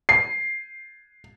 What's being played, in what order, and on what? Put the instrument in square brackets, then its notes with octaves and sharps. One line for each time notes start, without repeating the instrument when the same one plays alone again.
[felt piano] C7